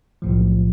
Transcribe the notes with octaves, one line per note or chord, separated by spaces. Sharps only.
B1 A2 F3